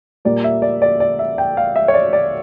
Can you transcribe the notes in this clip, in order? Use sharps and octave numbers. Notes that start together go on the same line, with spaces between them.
A#2 G3 A#3 D5
E5
D5
D5
D5
E5
G5
F5
E5
C#5
D5
D5